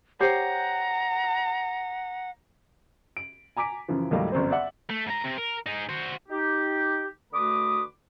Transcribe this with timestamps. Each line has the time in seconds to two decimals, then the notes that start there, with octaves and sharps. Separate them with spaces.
0.20 G4 C5 C#5 F#5 A#5
3.17 D7
3.57 G#5 A#5 D6 B6 D7
3.88 F#2 C#3 E3 F3
4.11 D#2 A2 F#3 G3 D#5 F5
4.32 G1 F#2 C4 C5
4.51 D5 E5 F#5
4.90 A3
5.07 G#2 A#5
5.24 C3
5.37 A#4
5.66 D#4 G#4
5.89 F#4 C5
6.29 D#4 G4
7.33 D3 A3 F#4 B4 D6 D#6